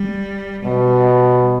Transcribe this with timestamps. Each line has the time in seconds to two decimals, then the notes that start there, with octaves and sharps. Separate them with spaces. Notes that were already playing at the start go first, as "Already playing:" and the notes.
Already playing: G3
0.64 B2 G3